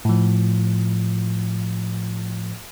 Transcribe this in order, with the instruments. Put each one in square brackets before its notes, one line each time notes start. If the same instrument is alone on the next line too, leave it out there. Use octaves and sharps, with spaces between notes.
[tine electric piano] A2 F3